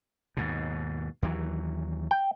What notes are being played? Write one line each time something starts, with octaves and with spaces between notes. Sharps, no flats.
D#2 G#2 B2
D#2 E3 F#3
G5